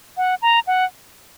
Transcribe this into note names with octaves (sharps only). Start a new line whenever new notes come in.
F#5
A#5
F#5